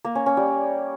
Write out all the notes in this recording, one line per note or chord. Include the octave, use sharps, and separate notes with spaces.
A#3
C#4
C#4
G3